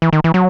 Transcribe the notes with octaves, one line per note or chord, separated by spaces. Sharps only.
E3
D#3
E3
F#3